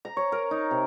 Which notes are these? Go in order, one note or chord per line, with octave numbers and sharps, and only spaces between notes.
A#5
C#5
A#4
D#4
C3